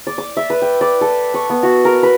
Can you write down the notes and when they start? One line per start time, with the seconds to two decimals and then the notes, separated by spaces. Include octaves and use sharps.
0.07 D5
0.18 D6
0.37 E5
0.50 B4
0.62 G5
0.81 D5
1.01 A4
1.34 C#6
1.50 B3
1.63 F#4
1.85 A#4
2.03 B4